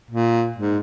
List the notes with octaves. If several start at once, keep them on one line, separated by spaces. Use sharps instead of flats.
A#2
G#2